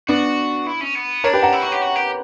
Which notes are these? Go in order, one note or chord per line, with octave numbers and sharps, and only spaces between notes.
B3 D4 F#4
E4
C#4
B3
D4 A#4 C#5
G4 B4
F#5 A#5
E4
F#4
G4
F#4
G4